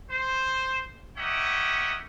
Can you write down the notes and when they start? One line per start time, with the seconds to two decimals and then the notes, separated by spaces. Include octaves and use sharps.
0.11 C5
1.16 G4 A#4 C#5 D#5 E5 F#5